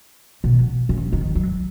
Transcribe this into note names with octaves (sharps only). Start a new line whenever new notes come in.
B2
C#3
D#3
F#3